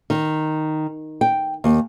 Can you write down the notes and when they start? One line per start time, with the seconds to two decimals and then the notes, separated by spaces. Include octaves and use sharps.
0.10 D#3
1.21 G5
1.64 D#2